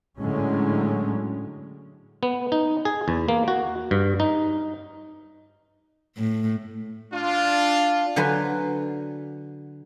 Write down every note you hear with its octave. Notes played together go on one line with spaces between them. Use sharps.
A2 D3 F#3 G#3 C#4
B3
D#4
G#4
E2
A#3
F#4
G2
D#4
A2
D4 F4
D3 F#3 B4 C5 G#5